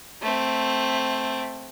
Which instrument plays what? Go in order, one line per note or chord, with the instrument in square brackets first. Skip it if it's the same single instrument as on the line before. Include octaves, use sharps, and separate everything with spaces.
[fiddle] A3 C4